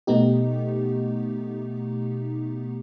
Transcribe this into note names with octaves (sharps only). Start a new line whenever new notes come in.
B2 A3 B3 D#4 G4